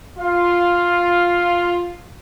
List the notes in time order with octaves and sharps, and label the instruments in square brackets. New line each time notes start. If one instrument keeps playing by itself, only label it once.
[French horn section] F4 [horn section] F5